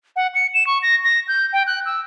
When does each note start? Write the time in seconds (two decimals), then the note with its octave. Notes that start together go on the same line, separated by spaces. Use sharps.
0.16 F#5
0.35 C#7
0.54 E7
0.67 C#6
0.82 A#6
1.04 A#6
1.28 G6
1.53 G5
1.67 F#6
1.86 E6